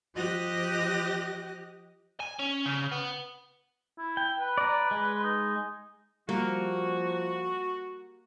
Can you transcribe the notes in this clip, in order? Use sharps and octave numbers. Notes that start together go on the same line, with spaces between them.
F3 G4 D#5 F#6 A#6
G#5
C#4
C#3
B3
E4
G5
B4
D5 A#5
G#3
D#4
F3 G3 A#3 F#4